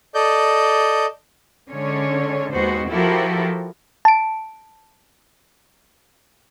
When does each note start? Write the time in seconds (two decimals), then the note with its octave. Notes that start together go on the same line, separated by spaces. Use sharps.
0.15 A4 D5 D#5 G6
1.71 D3 G#3 C#4 C#5
2.53 D#2 G#3 B3 F#4 C5
2.90 F3 E4 F#4 G4 A4 A#4
4.05 A5 D7